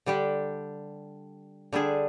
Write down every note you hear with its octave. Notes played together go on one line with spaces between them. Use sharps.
D3 G3 D4 G4
D3 G3 D4 G#4